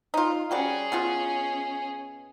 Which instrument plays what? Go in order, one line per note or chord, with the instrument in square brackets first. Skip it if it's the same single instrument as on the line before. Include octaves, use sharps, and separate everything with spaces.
[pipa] D#4 F4
[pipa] G3 F#4 D5 [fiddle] C#4 G#4
[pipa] B2 B3 F4